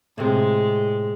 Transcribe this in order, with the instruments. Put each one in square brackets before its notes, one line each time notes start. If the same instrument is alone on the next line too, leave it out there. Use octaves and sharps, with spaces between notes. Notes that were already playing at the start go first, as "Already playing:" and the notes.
[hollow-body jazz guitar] A2 C3 [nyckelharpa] G#3